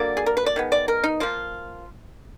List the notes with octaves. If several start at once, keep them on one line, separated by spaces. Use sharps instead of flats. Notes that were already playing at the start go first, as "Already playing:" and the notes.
Already playing: D3 F#3 A#3 D5
G#4
A#4
B4
D5
D#3 G#3 B3
D5
A#4
D#4
F3 A#3 F4